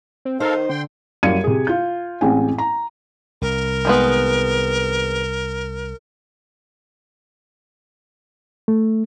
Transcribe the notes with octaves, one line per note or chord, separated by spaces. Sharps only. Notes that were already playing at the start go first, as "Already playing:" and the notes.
C4
D#4 A4 A#4 C5 F5
D#3
D3 G5 C6
F#2 G3 F5 G#6 C#7 D#7
C3 G#4
F4 G6
A1 G#3 C4 G5 G#5
A#5
C2 A#4
D#3 G#3 B3
A3